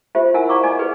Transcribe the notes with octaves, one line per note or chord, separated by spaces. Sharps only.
F4 G4 C5 E5
E4 A#4 F#5 G#5 E6
D5 F5 A#5 C#6 D6
D5 D#5 G#5
G4 G#4 B4